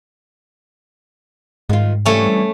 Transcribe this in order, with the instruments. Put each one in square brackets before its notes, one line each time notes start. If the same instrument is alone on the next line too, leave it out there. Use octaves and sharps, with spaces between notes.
[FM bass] G#2 [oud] D#3 F4
[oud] C3 E3 G3 [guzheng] A3 C#4